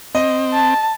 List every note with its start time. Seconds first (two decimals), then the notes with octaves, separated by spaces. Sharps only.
0.15 C4 D#5
0.53 A5